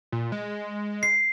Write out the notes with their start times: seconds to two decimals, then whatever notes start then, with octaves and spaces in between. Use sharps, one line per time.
0.12 A#2
0.32 G#3
1.03 C7